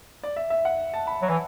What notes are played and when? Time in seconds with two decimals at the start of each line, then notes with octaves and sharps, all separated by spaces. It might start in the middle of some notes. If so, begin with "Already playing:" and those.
0.23 D5
0.36 E5
0.50 E5
0.65 F#5
0.94 A5
1.07 B5
1.22 F#3
1.29 E3